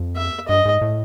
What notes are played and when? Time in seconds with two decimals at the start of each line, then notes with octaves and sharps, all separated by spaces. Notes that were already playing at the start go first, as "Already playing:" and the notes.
Already playing: F2
0.16 E5
0.48 G2 D#5
0.66 G#2
0.82 A2